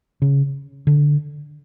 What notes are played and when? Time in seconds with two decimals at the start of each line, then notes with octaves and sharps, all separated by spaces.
0.22 C#3
0.87 D3